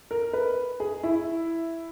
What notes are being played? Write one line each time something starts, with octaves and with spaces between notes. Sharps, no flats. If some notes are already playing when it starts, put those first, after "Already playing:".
A#4
B4
G#4
E4